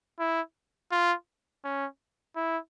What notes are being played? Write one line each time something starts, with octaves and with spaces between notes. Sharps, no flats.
E4
F4
C#4
E4